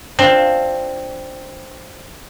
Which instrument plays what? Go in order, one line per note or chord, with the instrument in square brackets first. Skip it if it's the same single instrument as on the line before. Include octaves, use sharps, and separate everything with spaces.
[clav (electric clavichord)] C4 [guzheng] D4 F4